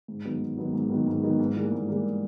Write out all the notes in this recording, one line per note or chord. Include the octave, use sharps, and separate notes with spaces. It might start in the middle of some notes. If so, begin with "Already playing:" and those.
G#2
D#3 F#3 B3 D#4
G#2
D#3 F#3 B3 D#4
G#2
D#3 F#3 B3 D#4
G#2
D#3 F#3 B3 D#4
G#2
E3 G3 A#3
G#2
E3 G3 A#3